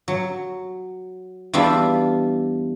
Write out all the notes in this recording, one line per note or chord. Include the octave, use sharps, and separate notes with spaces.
F#3
E2 G3 D4 F4 E5 B5